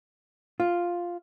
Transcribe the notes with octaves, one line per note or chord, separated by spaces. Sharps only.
F4